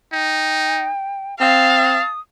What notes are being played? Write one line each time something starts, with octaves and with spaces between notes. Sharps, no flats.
D#4 G5
C4 F5 A5 D#6